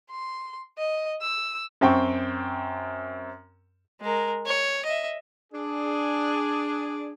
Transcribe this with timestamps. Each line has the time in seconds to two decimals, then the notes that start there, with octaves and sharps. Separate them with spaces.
0.11 C6
0.78 D#5
1.22 E6
1.81 F#2 C4 G5 C#6
4.01 G#3 A#4
4.46 C#5
4.85 D#5 E5
5.53 D4 G#4